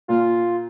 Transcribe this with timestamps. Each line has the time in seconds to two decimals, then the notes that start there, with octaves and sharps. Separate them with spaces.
0.08 A#2 F4